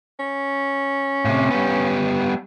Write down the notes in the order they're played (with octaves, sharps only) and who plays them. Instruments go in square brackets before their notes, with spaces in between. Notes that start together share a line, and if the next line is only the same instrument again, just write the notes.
[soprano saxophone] C#4
[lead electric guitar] A2 C3
G3 B3